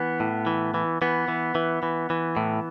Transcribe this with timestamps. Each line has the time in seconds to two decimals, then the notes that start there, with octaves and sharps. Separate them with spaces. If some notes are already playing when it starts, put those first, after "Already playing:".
Already playing: E3 B3
0.20 A2
0.47 E3
0.74 E3
1.02 E3 B3
1.28 E3
1.55 E3
1.83 E3
2.10 E3
2.37 A2